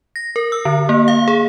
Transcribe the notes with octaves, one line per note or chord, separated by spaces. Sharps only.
A#6
A#4
E6
D3
A#3
F5
G#4